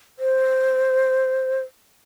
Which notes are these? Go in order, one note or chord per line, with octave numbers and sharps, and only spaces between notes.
C5